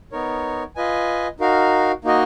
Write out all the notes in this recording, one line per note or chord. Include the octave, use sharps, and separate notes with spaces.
B3 D#4 A#4 C#5
F4 B4 D#5 G#5
D#4 F#4 A#4 F5
A#3 D#4 F#4 A#4 D#5